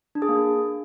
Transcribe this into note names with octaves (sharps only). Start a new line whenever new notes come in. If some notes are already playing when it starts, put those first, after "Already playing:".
D4
G#4
A#3